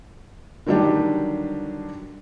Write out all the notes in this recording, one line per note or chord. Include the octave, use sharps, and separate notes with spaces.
D3 D#3 F#3 G3 D4 G4